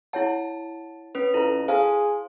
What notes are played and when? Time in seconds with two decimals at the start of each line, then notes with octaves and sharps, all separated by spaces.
0.13 E4 C#5 F#5 A5
1.15 C#4 B4
1.34 F2 E4 A4 A#5
1.68 G#4 C5 F5 A5